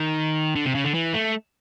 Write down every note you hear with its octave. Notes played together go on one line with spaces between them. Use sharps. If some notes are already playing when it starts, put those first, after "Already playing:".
Already playing: D#3
D3
C3
C#3
D3
E3
A3